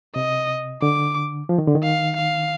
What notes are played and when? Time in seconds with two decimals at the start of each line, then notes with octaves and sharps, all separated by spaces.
0.16 C3 D#5
0.82 D3 D6
1.49 F3
1.58 D#3
1.67 D3
1.75 D#3
1.83 F5
2.17 F5